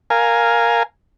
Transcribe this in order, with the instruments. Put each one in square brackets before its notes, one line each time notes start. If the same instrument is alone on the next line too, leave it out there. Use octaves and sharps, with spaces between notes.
[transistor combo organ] A#4 F5 G#5